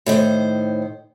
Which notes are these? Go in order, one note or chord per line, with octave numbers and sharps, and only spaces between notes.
A2 D#3 C5